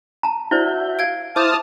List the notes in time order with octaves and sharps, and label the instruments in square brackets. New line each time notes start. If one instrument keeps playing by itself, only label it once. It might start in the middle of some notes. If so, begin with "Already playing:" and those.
[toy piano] A5 A#5
[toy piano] E4 C5 D5 [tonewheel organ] F#4 E5 G6
[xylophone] F5 G#6 D7
[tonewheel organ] E4 C5 [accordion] A5 D#6 F6 [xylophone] D6 G6